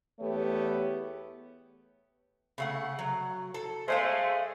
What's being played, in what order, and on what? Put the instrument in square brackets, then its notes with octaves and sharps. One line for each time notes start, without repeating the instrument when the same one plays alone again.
[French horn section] E2 A3 B3 G4 C#5
[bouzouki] C#3 A3 F#5
F#3
A4
[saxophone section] G#3 A3 [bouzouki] C5 D#5 F5